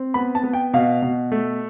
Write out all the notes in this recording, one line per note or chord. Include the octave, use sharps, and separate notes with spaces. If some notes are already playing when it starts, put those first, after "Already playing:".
Already playing: C4
B3 B5
A5
B3
G5
B2 F5
B2
A3